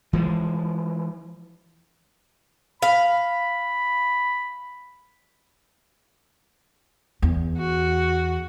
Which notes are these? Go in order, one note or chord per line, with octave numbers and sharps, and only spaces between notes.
E3 F3 G#3
F5 B5
E2
F#4